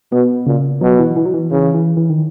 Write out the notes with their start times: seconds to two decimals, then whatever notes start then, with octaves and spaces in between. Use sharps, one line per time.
0.12 B2 B3
0.46 A#2 C#3
0.81 B2 F#3
0.99 E3
1.16 E3
1.26 F#3
1.34 E3
1.51 C#3 E3
1.74 E3
1.97 E3
2.10 D#3